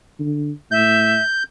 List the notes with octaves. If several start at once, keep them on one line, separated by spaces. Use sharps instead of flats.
D3
A2 E5 G6